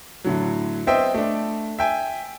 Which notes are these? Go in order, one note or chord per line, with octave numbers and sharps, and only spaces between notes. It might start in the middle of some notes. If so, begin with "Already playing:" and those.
A2 D3 F#3
B3 C4 C5 D#5 E5 G5
A3 D4
E5 G5 G#5